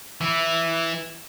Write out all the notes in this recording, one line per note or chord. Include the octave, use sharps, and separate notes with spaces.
E3 E4